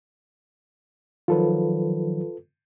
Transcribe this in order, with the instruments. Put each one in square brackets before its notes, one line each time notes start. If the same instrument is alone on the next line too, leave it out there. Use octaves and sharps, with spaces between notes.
[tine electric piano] D#3 F3 F#3 [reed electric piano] F4 A4 B4